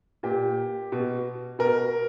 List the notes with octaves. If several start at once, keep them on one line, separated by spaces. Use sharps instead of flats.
A#2 G4
B2
B2 A#4